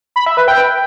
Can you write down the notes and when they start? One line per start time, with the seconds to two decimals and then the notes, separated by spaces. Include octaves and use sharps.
0.16 B5
0.26 E5
0.37 B4
0.48 G5